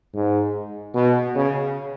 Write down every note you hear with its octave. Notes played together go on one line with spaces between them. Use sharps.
G#2
B2
C#3